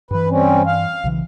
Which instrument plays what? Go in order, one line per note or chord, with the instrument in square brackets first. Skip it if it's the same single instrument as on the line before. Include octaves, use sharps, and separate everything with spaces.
[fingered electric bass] G2 E3 [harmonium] B4
[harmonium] G3 C4 C#4
F5
[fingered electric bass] B1 C#3 E3